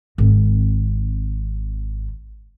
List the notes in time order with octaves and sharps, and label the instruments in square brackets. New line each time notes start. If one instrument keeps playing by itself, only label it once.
[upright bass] G#1 C4